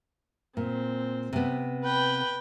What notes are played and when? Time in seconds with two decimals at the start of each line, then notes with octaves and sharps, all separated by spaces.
0.57 A#2 C4
1.33 C3 B3
1.84 B4 G5